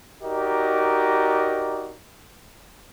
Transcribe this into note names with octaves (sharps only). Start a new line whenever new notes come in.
D#4 F#4 G4 A#4 D5 D#5